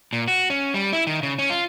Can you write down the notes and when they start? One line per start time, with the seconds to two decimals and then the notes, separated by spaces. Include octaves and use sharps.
0.13 A#2
0.28 F#4
0.50 C#4
0.74 G3
0.93 E4
1.07 D#3
1.23 C#3
1.39 C#4
1.50 F4